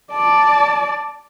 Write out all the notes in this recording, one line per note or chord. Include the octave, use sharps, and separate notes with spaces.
D5 A5